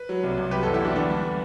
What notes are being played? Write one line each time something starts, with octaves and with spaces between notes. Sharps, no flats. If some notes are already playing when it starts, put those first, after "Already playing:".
Already playing: B4
F#3
C2
C2
F#3 G4 B4
F#4 A4
E2
E4 G4
E2 D4 F#4
D3 B3 D4
G3